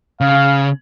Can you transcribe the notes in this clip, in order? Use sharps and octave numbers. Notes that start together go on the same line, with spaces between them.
C#3 F5